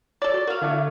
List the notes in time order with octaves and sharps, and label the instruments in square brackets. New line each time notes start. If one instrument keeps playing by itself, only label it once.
[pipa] A4 D5 [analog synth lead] C#5
[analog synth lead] F#4
[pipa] F#4 F5 [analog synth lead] A#4
[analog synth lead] D3 [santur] A3 D4 E4